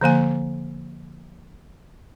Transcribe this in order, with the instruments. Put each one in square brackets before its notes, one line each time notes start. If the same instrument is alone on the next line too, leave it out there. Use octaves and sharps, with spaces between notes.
[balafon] D3 F3 A#3 G#5